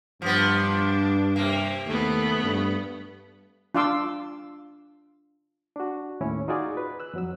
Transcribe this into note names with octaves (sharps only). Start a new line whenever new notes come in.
G2 F3 B3 D4
C3 A#3
D#2 A3 B3
G2
D4 F4 F5 C6 D6 E6
D4 F#4
D#2 A2 C#4 E4
D#4 F4 F#4 G#4 D5
B4
E6 F#6
F2 F#3 E6